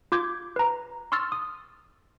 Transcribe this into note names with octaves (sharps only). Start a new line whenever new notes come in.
F4 D6 G6 G#6
B4 A#5
C6 C#6 E6 F6 A6
D#6